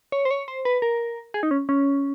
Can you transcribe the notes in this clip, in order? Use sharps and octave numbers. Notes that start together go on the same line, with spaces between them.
C#5
C5
C#5
C5
B4
A#4
G#4
D#4
C#4
C#4